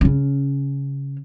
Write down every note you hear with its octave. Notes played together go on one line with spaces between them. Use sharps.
C#3 C#4